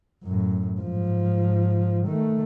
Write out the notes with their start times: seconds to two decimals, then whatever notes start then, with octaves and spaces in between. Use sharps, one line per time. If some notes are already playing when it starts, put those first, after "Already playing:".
0.24 F#2 A2
0.80 G#2 F3
2.07 D#3 A3